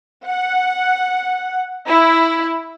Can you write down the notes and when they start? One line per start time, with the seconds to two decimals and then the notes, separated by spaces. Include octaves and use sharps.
0.27 F#5
1.86 E4